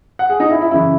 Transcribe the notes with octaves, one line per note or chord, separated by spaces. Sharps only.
F#5
G#4
D#4
E4
E4
F#2 C#3 E3 E4